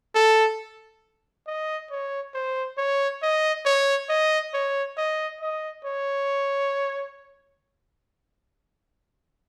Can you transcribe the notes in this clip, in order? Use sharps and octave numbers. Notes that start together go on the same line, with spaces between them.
A4
D#5
C#5
C5
C#5
D#5
C#5
D#5
C#5
D#5
D#5
C#5